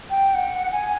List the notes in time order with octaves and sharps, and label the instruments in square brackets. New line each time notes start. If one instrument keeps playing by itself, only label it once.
[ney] G5
F#5
G#5